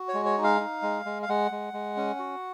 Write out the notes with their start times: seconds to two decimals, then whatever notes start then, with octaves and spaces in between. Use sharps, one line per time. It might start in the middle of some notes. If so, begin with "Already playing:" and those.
Already playing: F#4
0.09 C#5
0.14 G#3
0.26 C#5
0.38 D#4
0.44 F5
0.60 D#4
0.82 G#3
1.05 G#3
1.23 F5
1.29 G#3 F#5
1.51 G#3
1.73 G#3
1.97 C#4
2.19 F#4